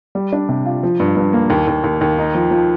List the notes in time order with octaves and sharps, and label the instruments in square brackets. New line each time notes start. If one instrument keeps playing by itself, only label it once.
[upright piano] G3
D4
C3
F4
F3
G2
G2
A#3
D#2
D#2
D#2
D#2
D#4
F3
F3